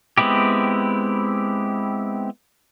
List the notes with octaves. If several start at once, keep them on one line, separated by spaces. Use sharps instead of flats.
G#3 B3 C4 E4 G4